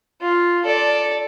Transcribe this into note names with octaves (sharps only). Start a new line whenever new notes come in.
F4
A4 D5